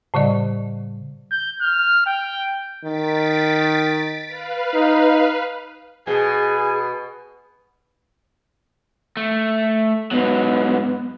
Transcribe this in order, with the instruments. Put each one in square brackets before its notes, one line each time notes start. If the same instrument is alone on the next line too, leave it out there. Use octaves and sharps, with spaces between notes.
[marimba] A2 C#3 G3 D5 D#5
[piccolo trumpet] G6
F6
G5
[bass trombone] D#3 [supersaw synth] A6 B6 D7
[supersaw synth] B4 F5
[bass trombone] D#4
[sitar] B2 [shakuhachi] G#4 [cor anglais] G#5
[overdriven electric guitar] A3
[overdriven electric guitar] G#2 F#3 [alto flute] B3